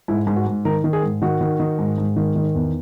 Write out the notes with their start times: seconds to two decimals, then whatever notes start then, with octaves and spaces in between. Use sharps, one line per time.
0.08 G#2 E4
0.27 G#2
0.36 F#4
0.47 G#2
0.65 D#3 A#4
0.84 D#3
0.93 G#4
1.03 G#2
1.22 D#3 F#4
1.41 D#3
1.60 D#3
1.79 G#2
1.98 G#2
2.16 D#3
2.36 D#3
2.55 E2